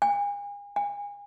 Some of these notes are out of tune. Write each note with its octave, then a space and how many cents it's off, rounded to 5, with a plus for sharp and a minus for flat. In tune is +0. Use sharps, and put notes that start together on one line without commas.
G#5 -40
G#5 -35